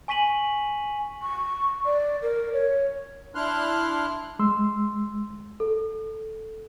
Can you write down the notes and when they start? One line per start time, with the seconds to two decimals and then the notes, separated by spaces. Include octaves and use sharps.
0.08 G#5 C#6 B6 D#7 F#7
1.22 C#6
1.85 D5
2.22 A#4
2.53 C#5
3.35 D4 E4 C6 F6 F#6
4.39 G#3 C6 E6
5.60 A4